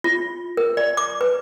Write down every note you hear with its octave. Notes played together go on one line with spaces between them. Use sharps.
F4
A#4
D5
D6
B4